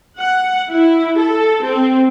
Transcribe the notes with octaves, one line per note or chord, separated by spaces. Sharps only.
F#5
E4
A4
C4